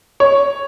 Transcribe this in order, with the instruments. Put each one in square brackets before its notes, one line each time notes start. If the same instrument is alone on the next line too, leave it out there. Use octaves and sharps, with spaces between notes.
[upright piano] C#5